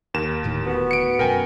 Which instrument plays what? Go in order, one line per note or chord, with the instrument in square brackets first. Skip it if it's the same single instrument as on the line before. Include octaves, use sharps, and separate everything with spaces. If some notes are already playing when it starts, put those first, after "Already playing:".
[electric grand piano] D#2 A#4 E7
[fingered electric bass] D1 A2 D#3
[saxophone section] B3 F#4
[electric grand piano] C#7 D7
[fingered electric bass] F#2 B2 [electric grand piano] A#4 G5 G#5